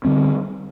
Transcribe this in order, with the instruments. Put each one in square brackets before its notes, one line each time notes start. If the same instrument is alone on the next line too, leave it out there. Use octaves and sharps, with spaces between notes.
[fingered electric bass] D3 G3 C4